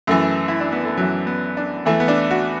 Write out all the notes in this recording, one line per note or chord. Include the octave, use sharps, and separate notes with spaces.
F#2 E3 A3
E4
D4
B3
A3
F#2 E3 F#3
B3
D4
E2 E3 A3
B3
D4
F#4